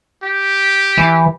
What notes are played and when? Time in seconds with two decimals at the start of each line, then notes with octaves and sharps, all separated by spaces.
0.23 G4
0.97 E3